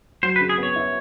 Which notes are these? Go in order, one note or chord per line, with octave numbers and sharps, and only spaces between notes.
F#3 C5
B4
C#3
G#4
B3 C#5
E4